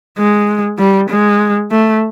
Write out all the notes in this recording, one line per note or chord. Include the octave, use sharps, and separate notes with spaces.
G#3
G3
G#3
A3